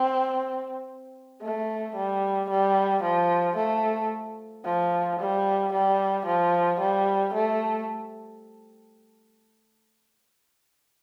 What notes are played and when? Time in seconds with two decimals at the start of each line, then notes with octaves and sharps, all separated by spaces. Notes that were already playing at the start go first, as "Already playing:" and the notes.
Already playing: C4
1.42 A3
1.96 G3
2.50 G3
3.03 F3
3.57 A3
4.65 F3
5.19 G3
5.73 G3
6.26 F3
6.80 G3
7.34 A3